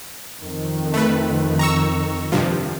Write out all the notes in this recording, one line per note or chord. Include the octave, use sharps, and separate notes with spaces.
F2 D#3
A3 B4
A#5 C#6 E6
G2 C3 F3